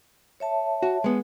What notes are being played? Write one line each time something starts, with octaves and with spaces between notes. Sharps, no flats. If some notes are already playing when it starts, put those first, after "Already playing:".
C#5 E5 A5
F#4
G#3 B3